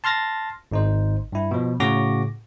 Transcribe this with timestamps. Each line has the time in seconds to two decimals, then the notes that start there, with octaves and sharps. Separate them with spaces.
0.04 A5 C6 F6 A6 A#6
0.71 G#1 D#4 C5
1.32 G2 E4
1.51 B2 F3
1.80 A2 C#3 F#4 D6 A#6